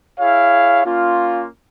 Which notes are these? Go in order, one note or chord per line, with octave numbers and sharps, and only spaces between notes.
E4 G#4 C#5 F5
A#3 C#4 F4